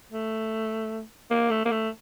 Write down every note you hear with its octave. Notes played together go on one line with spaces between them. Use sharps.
A3
A#3
A3
A#3
A3